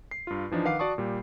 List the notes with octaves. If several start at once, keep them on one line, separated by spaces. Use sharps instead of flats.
C7
G2 F4
E3 F3 D4 D#4
D#3 B4 F5 F#5 D6 C7
F#4 D5 A5 C#6 D#6
A#2 G3